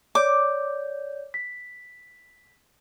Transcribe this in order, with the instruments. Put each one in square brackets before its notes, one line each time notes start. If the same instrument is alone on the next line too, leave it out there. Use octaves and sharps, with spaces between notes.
[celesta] C#5 D5 G6 [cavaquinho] D6
[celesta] B6